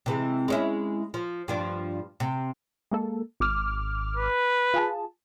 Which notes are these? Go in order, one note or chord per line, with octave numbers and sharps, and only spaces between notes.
C3 E3 G#3
G#3 C#4 E4
F3
G2 F3 D4
C3
G#3 A#3 A4
G#1 D6 F6
B4
F4 G#4 A5